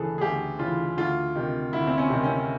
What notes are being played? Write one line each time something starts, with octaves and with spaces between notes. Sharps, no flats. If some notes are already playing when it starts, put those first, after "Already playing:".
Already playing: D2 C#3 E3 G#4 A4 B4
G#4
D2 G4
C#3 E3 F4
D2 F4
C3 D#3
D2 E4
C4
C#4
C3 D#3
C#4